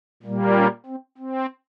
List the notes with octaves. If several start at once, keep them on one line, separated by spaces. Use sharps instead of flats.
A#2 G3 A#3
C#4
C4
C4